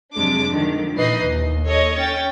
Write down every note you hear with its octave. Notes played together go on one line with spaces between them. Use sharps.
F2 C3 F#3 G#3 D4 D6
D3 D#3 F3
A#2 E3 D#4 B4 D#5 C7
D#2
A4 C#5 D#5
C#4 G5 A6